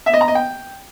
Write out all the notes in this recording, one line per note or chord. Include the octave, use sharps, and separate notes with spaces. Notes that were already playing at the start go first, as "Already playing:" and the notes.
E5
D#5
A#5
D#5
G5